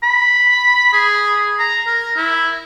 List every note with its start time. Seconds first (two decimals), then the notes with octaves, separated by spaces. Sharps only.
0.03 B5
0.93 G#4
1.59 A#5
1.87 A#4
2.16 E4